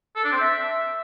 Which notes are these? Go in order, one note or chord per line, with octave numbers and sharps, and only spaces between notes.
A4
D4
C4
E5